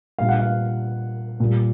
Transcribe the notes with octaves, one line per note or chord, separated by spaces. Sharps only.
A#2 G3 F5
F#5
F5
A#2 G3